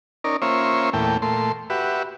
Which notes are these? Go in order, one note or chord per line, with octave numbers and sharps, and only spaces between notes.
C#4 D#4 A#4 D5
A#3 C#4 F4 C5 C#5 E5
E2 A#2 A3 G5
A#2 A3 C6
F#4 G4 B4 E5